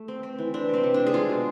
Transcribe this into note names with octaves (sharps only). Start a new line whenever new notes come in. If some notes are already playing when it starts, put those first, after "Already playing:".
Already playing: A3
C4
C4
E3
C4 D4
C3 C4
C3
D4
C3
G#4
G#3 F4
B2